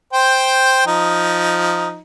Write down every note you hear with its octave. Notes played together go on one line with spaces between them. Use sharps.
C5 G5
F3 D#4